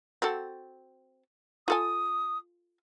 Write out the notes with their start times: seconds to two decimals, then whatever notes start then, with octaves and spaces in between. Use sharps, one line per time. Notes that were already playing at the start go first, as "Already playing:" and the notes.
0.22 C4 F#4 A4
1.68 F4 A4 G#5 D#6